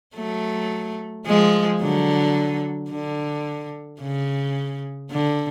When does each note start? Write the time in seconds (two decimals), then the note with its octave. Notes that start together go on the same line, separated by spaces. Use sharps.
0.16 F#3 A3
1.26 F3 G#3
1.81 D3 F#3
2.91 D3
4.01 C#3
5.11 D3